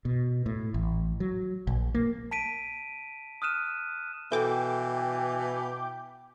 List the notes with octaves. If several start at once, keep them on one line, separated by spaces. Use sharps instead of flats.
B2
A2
A1
F#3
A#1
A#3
A5 B6 D7 D#7
D#6 F6 F#6 D#7 E7
B2 E3 A4 G5 D6 G6